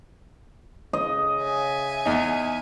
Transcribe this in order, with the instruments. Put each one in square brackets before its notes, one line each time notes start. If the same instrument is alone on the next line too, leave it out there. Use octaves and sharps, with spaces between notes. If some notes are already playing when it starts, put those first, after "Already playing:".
[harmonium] C#3 [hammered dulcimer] D#5
[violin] E5 G#5
[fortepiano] E2 D#4